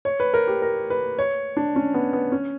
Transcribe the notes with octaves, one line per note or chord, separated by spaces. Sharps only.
C#5
B4
A#4
G4
A#4
B4
C#5
D4
C#4
B3
B3
C#4